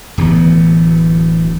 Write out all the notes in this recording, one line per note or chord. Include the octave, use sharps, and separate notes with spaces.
D1 D2 E3 B3